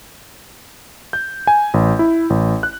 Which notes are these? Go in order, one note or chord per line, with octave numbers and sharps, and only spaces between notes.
G6
G#5
A1
E4
A1
F#6